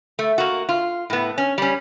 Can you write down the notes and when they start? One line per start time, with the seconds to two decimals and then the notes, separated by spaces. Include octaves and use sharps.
0.19 A3
0.38 A#3 F#4
0.69 F4
1.10 A2 B3
1.38 C#4
1.58 G3 C#4